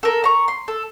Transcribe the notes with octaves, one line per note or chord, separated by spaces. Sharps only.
A4 A#4
A#5 C#6
C6
A4